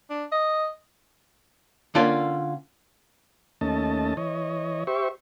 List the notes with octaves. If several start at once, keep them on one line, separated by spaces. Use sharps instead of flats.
D4
D#5
D3 A#3 C#4 F4 D5
D#2 A3 C#4 D#5 A5
E3 C#5 D#5
G4 C5 E5 C#6